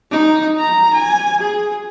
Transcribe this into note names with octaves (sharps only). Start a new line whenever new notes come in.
D#4
A#5
G#5
G#4